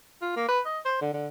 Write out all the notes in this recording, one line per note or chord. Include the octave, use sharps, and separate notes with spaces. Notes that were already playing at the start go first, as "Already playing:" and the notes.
F4
A#3
B4
D#5
C5
D3
D3